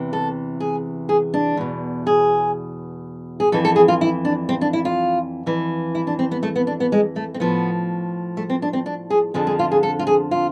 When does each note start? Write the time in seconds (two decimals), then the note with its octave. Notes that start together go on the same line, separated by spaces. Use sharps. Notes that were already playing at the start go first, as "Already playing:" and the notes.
Already playing: E2 C3 E3
0.13 A4
0.60 G#4
1.09 G#4
1.34 D4
1.57 E2 B2
2.07 G#4
3.40 G#4
3.52 F2 E3 A4
3.65 A4
3.76 G#4
3.88 F4
4.01 E4
4.25 D4
4.49 C4
4.61 D4
4.73 E4
4.85 F4
5.46 F2 E3
5.95 E4
6.07 D4
6.19 C4
6.31 B3
6.43 A3
6.56 B3
6.67 D4
6.80 B3
6.92 G#3
7.16 A3
7.34 C4
7.40 A2 F3 B3
8.37 A3
8.50 C4
8.62 D4
8.73 C4
8.86 D4
9.10 G#4
9.34 F2 D3 F3 G#4
9.47 G#4
9.59 F4
9.71 G#4
9.83 A4
9.99 F4
10.07 G#4
10.31 F4